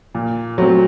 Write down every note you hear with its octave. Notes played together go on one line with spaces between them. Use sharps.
A#2
F#3 A3 C4